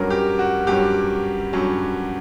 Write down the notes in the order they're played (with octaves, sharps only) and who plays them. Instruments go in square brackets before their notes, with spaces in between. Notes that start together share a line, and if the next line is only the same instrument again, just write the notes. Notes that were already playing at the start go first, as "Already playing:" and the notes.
Already playing: [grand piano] G2 F#3 C#4 A#4
G4
F#4
G2 F#3 C#4 G4
G2 F#3 C#4